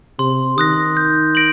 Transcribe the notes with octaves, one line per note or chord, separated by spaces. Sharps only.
C3 C6
D#3 D#6 F#6 A#6
G6
A#6 D7 F#7